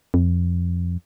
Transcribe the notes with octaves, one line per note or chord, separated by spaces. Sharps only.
F2